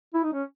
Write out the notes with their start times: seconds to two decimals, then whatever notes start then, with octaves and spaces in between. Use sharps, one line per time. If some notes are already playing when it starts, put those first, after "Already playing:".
0.14 E4
0.24 D#4
0.33 C#4